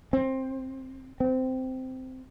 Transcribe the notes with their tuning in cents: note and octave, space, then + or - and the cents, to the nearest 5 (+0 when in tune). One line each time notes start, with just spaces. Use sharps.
C4 +15
C4 -15